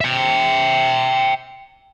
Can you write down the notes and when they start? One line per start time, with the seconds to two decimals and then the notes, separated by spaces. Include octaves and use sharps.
0.01 E5 G5